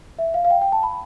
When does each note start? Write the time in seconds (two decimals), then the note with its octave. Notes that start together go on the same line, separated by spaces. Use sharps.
0.19 E5
0.34 F5
0.45 F5
0.51 G5
0.62 G5
0.72 A5
0.83 B5